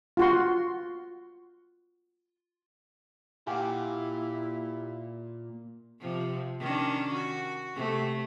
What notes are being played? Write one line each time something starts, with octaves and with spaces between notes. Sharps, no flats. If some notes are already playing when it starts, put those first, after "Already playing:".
F4 F#4 C6
A#2 E4 G4 F5 F#5 G#5
C3 F3
D#3 C#4 D4
F#4
C3 A3